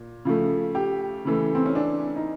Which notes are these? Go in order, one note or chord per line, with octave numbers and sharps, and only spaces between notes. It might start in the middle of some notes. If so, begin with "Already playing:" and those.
Already playing: A#2
C#3 F3 A3
G4
C#3 E3 A3
C4
C#4
D4
D#4